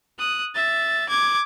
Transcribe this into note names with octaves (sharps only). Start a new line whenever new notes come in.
D#6 F#6
E5 A6
D6 G#6